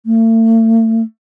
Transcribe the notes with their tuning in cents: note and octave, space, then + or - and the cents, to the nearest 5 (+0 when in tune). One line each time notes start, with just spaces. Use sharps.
A3 +40